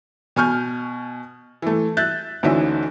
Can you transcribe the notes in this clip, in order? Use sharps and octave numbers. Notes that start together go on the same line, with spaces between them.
B2 G#5 C#6 F6 G6
E3 A3
E5 F#6 G6 A6
D2 D3 E3 C#4 D#4 E5